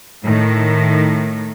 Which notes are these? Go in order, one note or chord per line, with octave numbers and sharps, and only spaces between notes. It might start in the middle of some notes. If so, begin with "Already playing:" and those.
A2 D#3